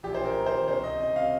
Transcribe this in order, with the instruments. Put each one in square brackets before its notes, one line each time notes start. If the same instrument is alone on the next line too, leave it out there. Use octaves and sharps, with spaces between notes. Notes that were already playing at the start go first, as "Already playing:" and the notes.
[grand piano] A#1 G4
C5
A#1 A#4
A#1
C5
D#3
C2 C5
C2 D#5
C2 D#5
C3 F5